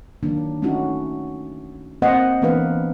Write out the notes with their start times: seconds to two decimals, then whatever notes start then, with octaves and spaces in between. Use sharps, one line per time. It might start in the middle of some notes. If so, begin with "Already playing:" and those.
0.23 D#3 F#3 A#3 D4
0.62 A3 C#4 D#4 E4 F#4
2.02 A#3 C4 C5 D#5 F#5
2.42 E3 A#3 B3 D4 B4 F5